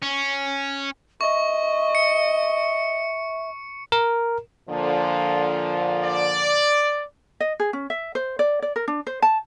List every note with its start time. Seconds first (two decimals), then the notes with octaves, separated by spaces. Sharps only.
0.03 C#4
1.21 D#5 E5 C#6
1.95 C#7
3.92 A#4
4.69 A#2 D3 F3
6.04 D5
7.40 D#5
7.60 G#4
7.73 C#4
7.90 E5
8.15 C5
8.39 D5
8.62 D5
8.76 A#4
8.88 D4
9.07 C5
9.22 A5